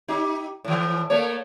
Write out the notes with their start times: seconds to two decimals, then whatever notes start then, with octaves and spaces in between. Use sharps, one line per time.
0.08 D#4 G4
0.64 A2 E3
1.10 A3 A#3 C#5